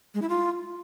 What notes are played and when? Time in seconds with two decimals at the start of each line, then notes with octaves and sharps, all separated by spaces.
0.15 G#3
0.22 E4
0.29 F4